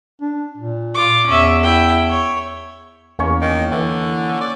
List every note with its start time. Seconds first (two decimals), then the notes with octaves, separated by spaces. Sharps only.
0.21 D4
0.57 A#2
0.95 F4 D6
1.27 E2 C#4 E5
1.63 E4 G5
2.09 C#5
3.19 E2 A#3 C#4 C#5
3.41 D#3
3.72 D3 E3
4.41 D5